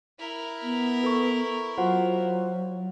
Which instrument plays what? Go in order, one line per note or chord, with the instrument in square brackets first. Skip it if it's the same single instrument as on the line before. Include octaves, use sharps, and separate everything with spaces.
[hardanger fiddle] E4 A#4
[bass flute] B3
[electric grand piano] A4 [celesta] B4 C#6
[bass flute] F#3 [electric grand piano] F4 F#4 C5 [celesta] F#5